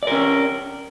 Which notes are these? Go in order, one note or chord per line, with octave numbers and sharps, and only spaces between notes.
C#4 A#4 D5